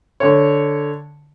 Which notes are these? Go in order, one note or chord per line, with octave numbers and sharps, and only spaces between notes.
D3 C#5